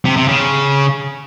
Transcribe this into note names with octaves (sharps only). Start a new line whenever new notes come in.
C3
C3
C#3